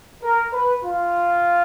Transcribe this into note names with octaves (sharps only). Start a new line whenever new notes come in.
A#4
B4
F4